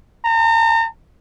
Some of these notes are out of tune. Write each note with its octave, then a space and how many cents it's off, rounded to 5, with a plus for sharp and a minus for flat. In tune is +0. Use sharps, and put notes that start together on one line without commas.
A#5 -40